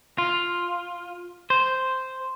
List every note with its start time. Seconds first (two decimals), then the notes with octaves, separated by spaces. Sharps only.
0.18 F4
1.50 C5